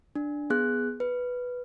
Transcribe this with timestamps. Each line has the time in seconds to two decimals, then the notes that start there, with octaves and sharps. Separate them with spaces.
0.15 D4
0.50 B3 G#4 F#6
1.00 B4